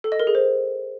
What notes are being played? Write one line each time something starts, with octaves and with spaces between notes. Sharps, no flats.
A4
D#5
A#4
G#4
C5